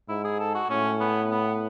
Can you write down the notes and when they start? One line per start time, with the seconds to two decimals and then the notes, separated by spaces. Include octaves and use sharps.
0.09 G#2 E4
0.24 G#4
0.39 A4
0.55 F#4
0.70 A2 C#4
1.00 B3
1.31 B3